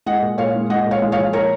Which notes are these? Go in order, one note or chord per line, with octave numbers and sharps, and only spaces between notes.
G#3 D#5 F#5
A#2
A#2 C#5 F5
G#3
G#3 D#5 F#5
A#2
C#5 F5
G#3
C#5 F5
F3
A#2 A#4 C#5